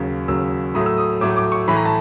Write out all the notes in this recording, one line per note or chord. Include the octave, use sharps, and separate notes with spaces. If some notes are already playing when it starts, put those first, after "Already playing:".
Already playing: D#2 C#3 F#3
D#2 C#3 F#3 E6
A2 F#3 A3 D#6
E6
D#6
A2 F#3 A3 D6
D6
C#6
A2 E3 A3 B5
A#5
A5